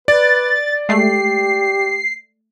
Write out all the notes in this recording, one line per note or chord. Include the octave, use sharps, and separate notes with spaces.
B4 D5 A6
G#3 A3 G4 C7